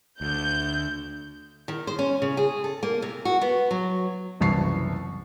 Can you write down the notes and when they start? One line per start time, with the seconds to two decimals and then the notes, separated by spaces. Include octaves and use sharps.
0.21 D2 G6
1.68 D#3
1.87 C5
1.99 C#4
2.22 C#3
2.37 G#4
2.64 A4
2.83 A#3
3.02 C3
3.25 F#4
3.41 B3
3.71 F#3
4.40 F#1 C2 E3 A5 C#6 C7